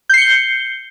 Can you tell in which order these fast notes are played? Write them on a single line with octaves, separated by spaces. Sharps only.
G6 C7 C#7 G7